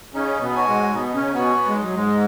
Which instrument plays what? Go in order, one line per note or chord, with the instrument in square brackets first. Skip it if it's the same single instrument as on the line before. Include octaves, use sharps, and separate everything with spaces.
[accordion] C#3 C#4 [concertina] D#4
[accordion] B2 B3
[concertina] F#4 C#5 G#5
[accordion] G#2 G#3
G#3
[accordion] B2 B3 [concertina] D#4
[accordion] C#3 C#4
[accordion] B2 B3 [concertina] F#4 C#5 G#5
[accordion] B3
G#3
[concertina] D#4
[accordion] F#3
G#2 G#3